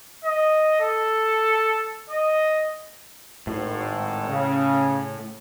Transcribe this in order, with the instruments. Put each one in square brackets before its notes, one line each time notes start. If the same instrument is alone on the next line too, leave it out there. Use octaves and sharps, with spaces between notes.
[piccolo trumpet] D#5
A4
D#5
[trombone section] G#1 [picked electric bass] A2
[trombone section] C#3